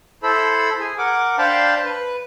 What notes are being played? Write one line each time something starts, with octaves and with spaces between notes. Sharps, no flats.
E4 A4 C5 B5 E6
G#4
A#4 F#5 D6
D4 C5 F5 G5 A5 B5
B4